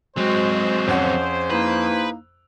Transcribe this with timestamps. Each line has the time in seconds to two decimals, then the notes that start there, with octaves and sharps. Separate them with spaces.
0.17 F#3 G#3 C4 F#4 G#4 C5
0.87 F2 C#4 F#5
1.50 A#3 D#4 E4 B4